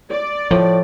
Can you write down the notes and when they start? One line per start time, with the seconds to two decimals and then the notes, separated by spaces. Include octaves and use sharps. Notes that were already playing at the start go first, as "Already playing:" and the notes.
0.10 D5
0.51 A2 F3